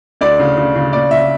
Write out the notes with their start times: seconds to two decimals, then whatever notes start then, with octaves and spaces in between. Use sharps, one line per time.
0.21 D2 D5
0.40 C#3
0.57 C#3
0.76 C#3
0.93 A#2 D5
1.11 A#2 E5